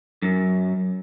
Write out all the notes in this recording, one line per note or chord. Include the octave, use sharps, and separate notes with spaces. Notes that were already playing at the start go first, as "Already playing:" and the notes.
F#2